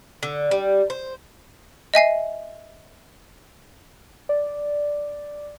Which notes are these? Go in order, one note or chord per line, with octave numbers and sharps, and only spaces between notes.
D3
G3
C5
D#5 E5 G#5 C7
D5